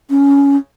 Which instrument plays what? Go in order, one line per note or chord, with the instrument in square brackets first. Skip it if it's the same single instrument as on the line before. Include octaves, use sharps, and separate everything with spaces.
[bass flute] C#4